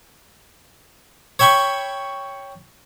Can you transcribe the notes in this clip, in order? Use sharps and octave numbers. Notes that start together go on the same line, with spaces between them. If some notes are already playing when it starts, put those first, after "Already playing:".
C#5 E5 G5 B5 C#6